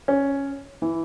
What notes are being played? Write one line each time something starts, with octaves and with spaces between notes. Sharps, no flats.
C#4
E3